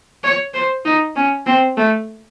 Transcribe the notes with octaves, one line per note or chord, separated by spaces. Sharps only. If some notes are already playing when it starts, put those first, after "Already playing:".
C#5
C5
D#4
C#4
C4
A3